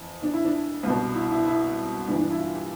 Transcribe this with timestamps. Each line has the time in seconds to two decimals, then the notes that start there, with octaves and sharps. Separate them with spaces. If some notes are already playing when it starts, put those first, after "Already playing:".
Already playing: F2 E3
0.22 D4
0.34 E4
0.45 D4
0.83 C2 B2
1.15 E4
1.31 E4
1.46 E4
2.07 G2 D4
2.10 E3
2.19 D4
2.30 E4
2.38 F4
2.55 G4